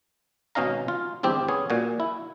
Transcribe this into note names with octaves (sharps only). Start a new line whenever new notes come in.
G#1 B2 C#4 D#4 F5 A#5
F4
G1 E2 C4 G4
B3 C#4 G#4
A#2 F#4 G#5
E4